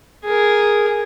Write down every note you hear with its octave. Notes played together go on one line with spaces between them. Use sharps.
G#4 A#4